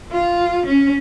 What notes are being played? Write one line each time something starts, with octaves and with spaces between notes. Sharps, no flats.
F4
C#4